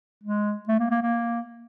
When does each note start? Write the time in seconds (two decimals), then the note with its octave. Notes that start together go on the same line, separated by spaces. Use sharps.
0.24 G#3
0.68 A3
0.79 A#3
0.91 A#3
1.02 A#3